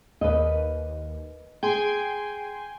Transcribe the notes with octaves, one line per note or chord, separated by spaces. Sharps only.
D#2 B4 D#5
G#4 G5 G#5 C6